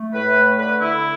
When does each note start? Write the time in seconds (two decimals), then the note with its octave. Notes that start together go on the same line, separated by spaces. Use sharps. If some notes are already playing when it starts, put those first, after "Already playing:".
Already playing: A3
0.13 A2 B4
0.36 A3
0.58 D3 B4
0.80 D3 E4